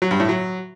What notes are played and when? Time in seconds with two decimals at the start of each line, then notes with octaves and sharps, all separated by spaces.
0.02 F#3
0.11 G2
0.20 A2
0.29 F#3